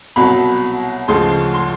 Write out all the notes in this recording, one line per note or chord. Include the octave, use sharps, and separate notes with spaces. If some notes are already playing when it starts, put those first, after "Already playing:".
C2 B2 F#3 B5
D2 C#3 F3 G#3 C6
C6